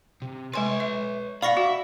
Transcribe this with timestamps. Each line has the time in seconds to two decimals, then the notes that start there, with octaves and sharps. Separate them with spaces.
0.22 C3
0.54 G#3 B4 C#5 G#5 C6
0.80 E5
1.42 D5 F5 F#5 B5 C#6 A#6
1.57 F#4 E5